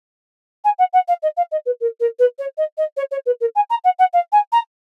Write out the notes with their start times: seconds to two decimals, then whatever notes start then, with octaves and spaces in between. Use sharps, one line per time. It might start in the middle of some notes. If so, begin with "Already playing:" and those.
0.64 G#5
0.78 F#5
0.93 F#5
1.08 F5
1.22 D#5
1.37 F5
1.51 D#5
1.66 B4
1.80 A#4
2.00 A#4
2.19 B4
2.39 C#5
2.57 D#5
2.77 D#5
2.97 C#5
3.11 C#5
3.26 B4
3.40 A#4
3.55 G#5
3.70 A#5
3.84 F#5
3.99 F#5
4.13 F5
4.32 G#5
4.52 A#5